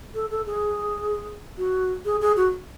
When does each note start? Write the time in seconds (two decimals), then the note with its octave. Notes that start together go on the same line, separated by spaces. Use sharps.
0.15 A4
0.31 A4
0.46 G#4
1.58 F#4
2.05 G#4
2.21 G#4
2.36 F#4